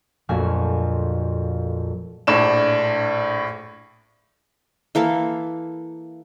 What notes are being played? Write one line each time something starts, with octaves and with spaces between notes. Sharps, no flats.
A#1 F2 A3 F#4 G#5
A#1 A2 D4 E7
E3 A#3 A4 F5